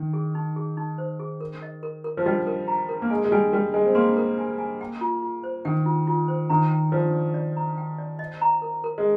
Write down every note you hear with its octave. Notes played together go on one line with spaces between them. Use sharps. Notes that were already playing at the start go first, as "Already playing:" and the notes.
Already playing: D#3
G#4
D#4
G#4
D#4
C5
G#4
A#4
D#5
A#4
A#4
F3
G3 D#5
A#4
A#5
A#4
A#3
G#3 G#5
G#3
G3 G#5
G3 A#4
G#3 G#5
C4
A#3 C6
A#4
G#5
G#5
G5
F4
F4
C5
D#3 G5
F4
F4
C5
D#3 A#5
G5
F3 D5
D5
D5
A#5
G5
D5
D#5
A#5
A#4
A#4
G#3